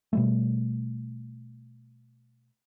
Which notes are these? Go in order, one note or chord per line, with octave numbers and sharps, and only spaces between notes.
B2 G3 A3